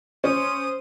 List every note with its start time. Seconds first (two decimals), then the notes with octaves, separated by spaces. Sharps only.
0.24 C#4 C5 D#6